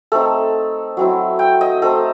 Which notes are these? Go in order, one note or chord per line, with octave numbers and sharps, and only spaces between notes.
A3 C4 D#4 A4
F#3 C4 E4
G5
D#5
A3 C4 D#4 A4